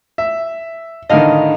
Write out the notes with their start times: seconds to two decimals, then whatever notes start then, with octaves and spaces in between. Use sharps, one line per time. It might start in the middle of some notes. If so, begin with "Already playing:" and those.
0.18 E5
1.09 A2 D3 D#3 D#5 F5